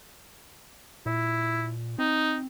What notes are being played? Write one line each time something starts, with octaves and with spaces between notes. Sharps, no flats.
A#2 E4
C4 D#4